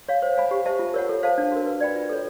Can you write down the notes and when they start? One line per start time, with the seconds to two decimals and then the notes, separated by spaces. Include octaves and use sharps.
0.08 C#5 F5
0.22 C5
0.37 F5 G#5 B5
0.51 G4
0.66 C5 E5 A5
0.79 F4
0.94 A#4 C#5 F#5
1.09 A4
1.23 C5 F5 A5
1.38 D4
1.52 F#4 A#4
1.66 B4
1.80 D5 G5 B5
1.96 F4
2.09 A4 C#5